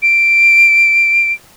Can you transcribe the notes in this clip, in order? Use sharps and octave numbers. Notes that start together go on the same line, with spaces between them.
D7